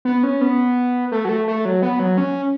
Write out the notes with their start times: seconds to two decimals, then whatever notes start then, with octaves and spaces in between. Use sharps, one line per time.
0.05 B3
0.23 C#4
0.41 B3
1.12 A3
1.25 F#3
1.29 A3
1.48 A3
1.65 F#3
1.82 B3
1.99 F#3
2.18 C#4